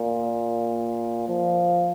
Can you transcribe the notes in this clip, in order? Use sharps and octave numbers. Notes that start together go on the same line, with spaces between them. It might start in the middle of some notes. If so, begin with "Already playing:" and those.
Already playing: A#2
F3